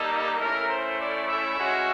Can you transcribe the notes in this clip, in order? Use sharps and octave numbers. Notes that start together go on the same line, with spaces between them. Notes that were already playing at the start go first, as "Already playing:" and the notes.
Already playing: G3 A#3 D#4 A4
A3 C#4 E4 A#4
C5
D5
E5
G#3 C#4 F#4